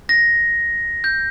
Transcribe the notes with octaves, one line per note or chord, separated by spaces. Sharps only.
A#6
G6